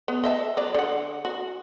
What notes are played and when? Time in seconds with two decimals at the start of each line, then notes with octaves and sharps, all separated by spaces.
0.08 B3
0.24 D#5 E5 A5
0.57 F#3 D5
0.74 D3 F#5
1.25 F#4